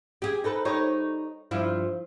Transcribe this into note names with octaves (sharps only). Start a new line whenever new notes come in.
G4 G#4
D#4 A4 B4
G3 D#4 C#5
G2 F3 E4